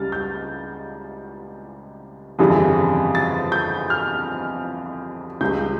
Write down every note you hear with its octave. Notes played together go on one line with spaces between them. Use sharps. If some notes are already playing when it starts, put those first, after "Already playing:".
Already playing: C#2 C#3 G3 F6 A6
G6
G1 F2 C#3 E3 G3
A6
G6
F6
C#2 C#3 G3 G6